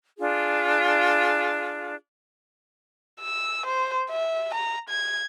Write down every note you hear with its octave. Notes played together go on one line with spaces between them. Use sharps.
D4 F4 G#4
E6
C5
E5
A#5
G#6